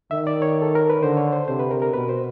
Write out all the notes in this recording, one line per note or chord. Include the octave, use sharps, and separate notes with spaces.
D#3 E5
D5
C#5
A4
A#4
B4
D3 C5
C#5
C5
C3 C5
B4
A#4
A#4
B2 B4
C5